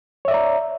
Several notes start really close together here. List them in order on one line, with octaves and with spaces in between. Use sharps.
C#5 E5 D5 A#5